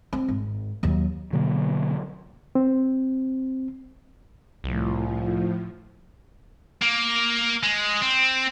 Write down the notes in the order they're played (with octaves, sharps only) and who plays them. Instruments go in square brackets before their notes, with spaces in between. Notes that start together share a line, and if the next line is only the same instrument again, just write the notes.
[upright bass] C4
G#1
D#2 F#3
[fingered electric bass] B2 D3 F#3 A#3
[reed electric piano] C4
[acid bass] C2 [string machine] A2 F3
[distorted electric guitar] A#3
G#3
C4